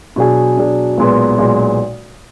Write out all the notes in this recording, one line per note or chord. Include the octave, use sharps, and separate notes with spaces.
B2 F#3 D4 G#4
B2 F#3 D4 G#4
B1 A#2 G#3 B3
B1 A#2 G#3 B3